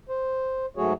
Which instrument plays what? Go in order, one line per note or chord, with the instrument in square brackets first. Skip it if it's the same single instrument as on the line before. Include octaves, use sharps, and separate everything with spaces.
[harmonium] C5
G#2 F#3 A3 F#4 G#4 C#5